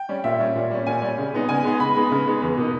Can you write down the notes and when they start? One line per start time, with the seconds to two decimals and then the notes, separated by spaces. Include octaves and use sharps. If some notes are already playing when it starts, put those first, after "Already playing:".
Already playing: G5
0.09 G3 C#4
0.24 A#2 E5
0.40 G3 C#4
0.56 A#2
0.71 G3 C#4
0.86 A#2 G#5
1.02 G3 C#4
1.18 C#3
1.33 G#3 B3 D#4
1.49 C#3 G#5
1.64 G#3 B3 D#4
1.80 C#3 B5
1.96 G#3 B3 D#4
2.11 C#3
2.27 G#3 B3 D#4
2.42 E2
2.57 B2 A#3 D#4